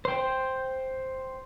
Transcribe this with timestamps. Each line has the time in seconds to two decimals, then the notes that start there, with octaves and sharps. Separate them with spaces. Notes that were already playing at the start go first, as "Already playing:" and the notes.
0.05 C5 G5